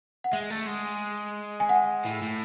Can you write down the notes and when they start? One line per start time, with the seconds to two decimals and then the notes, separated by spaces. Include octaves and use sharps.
0.24 F#5
0.32 G#3 E5
0.50 A3
0.66 G#3
1.60 G#5
1.69 F#5
2.05 A2
2.22 A2